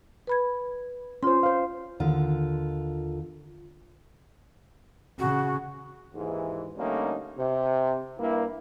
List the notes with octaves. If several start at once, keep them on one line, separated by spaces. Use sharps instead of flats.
B4 B5 G#6
C#4 F4 C5 C6
C5 F5
D#2 D3 F4
C#3 F#4
D#2 G#2 E3
D3 G3 A3 A#3 C#4 D#4
C3
G2 A#3 E4